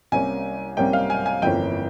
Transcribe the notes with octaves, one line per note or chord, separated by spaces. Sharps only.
C2 C3 G3 A#3 C#4 G#5
C2 C3 G3 A#3 C#4 G5
F5
G#5
G#5
G1 F2 E3 A#3 C#4 G5